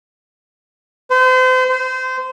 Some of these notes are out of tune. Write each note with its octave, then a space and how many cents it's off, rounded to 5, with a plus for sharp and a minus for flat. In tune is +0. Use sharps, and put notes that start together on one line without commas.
C5 -35
C5 -25